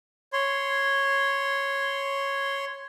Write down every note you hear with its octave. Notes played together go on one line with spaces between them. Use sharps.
C#5 C6